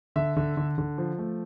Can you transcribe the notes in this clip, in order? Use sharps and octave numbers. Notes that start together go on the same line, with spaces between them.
D3 E5
D3
D3
D3
F3
A3